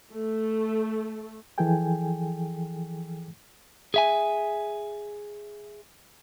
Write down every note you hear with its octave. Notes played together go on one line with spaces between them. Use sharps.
A3
E3 F3 G#4 A4 G5 G#5
G#4 E5 G#5